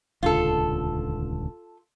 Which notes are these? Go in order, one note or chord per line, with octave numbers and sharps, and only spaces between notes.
D#1 C#2 D3 F4 A4